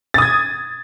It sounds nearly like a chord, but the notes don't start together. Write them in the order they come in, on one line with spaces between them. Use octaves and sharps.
A6 D#6 G#6